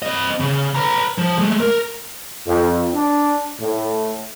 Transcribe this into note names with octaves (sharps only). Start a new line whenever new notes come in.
C4 D#5
C#3
B4 A#5
F3
G#3 A3
A#4
F2
D4
A2